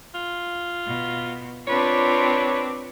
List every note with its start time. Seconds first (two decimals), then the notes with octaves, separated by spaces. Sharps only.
0.15 F4
0.86 B2
1.67 C4 D4 F4 B4 C#5 D6